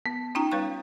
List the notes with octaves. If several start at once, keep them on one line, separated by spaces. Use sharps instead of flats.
B3
C#4 D#4 F4 G5 A#5
G3 B4 C#5 F5 C#6 F#6